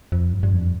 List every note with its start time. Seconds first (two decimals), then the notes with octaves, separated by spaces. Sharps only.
0.12 F2
0.33 G2
0.43 G2
0.53 F2